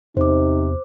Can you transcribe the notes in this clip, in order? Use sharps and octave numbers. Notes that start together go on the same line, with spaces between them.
E2 C3 D#4 C5 D6